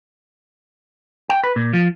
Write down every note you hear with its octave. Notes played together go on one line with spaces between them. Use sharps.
G5
B4
A#2
F3